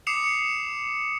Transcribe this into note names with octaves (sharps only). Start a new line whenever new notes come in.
D6 D#6 C7 C#7 E7 F7